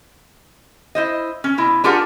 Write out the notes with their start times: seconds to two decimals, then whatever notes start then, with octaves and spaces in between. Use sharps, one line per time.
0.95 E4 C5 D#5
1.44 C#4
1.58 B2 E4
1.84 D4 F4 G4 G#4 A#4 F#5